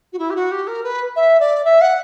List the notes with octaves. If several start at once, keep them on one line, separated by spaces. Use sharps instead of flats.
F#4
E4
G4
F#4
G4
A#4
B4
E5
D5
E5
F#5